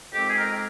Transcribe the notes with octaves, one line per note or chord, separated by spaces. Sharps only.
F2 D#3 G#3 C4 G4
G#4
A#4